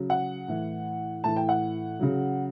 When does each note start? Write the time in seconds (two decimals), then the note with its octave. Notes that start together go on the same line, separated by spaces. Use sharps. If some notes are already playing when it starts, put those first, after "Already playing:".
Already playing: C#3 F#3
0.10 F#5
0.48 A2 E3
1.24 A2 E3 A5
1.36 G5
1.49 F#5
2.00 C#3 F#3